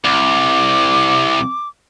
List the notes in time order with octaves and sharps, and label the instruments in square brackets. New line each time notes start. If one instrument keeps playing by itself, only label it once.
[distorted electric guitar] C2 [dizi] D6